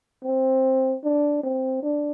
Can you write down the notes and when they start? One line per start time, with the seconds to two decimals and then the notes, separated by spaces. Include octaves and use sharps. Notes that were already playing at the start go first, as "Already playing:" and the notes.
0.24 C4
1.04 D4
1.43 C4
1.83 D4